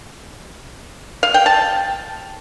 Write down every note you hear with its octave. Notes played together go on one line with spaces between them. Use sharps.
F5
G5
A5